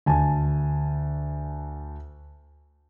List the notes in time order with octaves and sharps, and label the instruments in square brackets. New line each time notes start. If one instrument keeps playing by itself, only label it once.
[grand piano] D2 G#5 A5